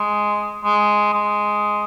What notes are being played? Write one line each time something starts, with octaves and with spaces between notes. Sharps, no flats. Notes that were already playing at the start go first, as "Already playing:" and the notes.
Already playing: G#3
G#3
G#3